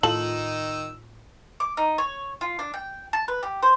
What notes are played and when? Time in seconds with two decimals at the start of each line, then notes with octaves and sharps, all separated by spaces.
0.03 A2 D#3 D#4 F4 A4 E6 F#7
1.60 D6
1.77 D#4
1.98 C#5
2.41 F4
2.59 D4
2.74 G5
3.13 A5
3.28 B4
3.43 G4
3.63 C5